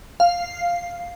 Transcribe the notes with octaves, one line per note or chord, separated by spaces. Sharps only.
F5